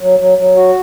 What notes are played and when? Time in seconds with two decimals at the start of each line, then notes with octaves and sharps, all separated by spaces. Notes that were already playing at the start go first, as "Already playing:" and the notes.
0.01 F#3
0.19 F#3
0.38 F#3
0.56 F#4